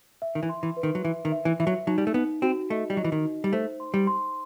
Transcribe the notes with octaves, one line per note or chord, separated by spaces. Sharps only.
E5
D#3
E3
C6
E3
B4
D#3
F#3
E3 E5
D#3
E5
E3
E3 E5
F#3
F#3 D#4
G3
A3
B3 D#4
C4 F#4
A3 D#5
G3
F#3 D#5
E3
D#3
D#4
G3
A3 C5
C6
G3
C6